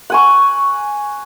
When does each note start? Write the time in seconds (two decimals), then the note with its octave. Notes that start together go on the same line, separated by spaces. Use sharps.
0.10 F#5 G#5 C#6